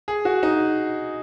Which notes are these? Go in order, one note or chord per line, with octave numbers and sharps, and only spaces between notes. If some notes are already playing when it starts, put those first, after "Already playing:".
G#4
F#4
D#4